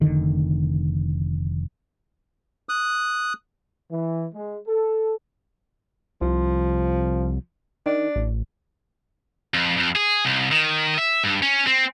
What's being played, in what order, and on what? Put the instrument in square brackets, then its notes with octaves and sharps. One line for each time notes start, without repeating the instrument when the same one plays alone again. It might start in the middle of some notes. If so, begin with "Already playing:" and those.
[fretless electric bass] F1 D3 D#3
[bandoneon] D#6 F#6
[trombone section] E3
G#3
A4
[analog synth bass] C2 [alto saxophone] F3
[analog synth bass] D#3 [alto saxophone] D4
[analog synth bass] A1
[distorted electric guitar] F2
F2
G#4
C2
D#3
E5
G2
C#4
C4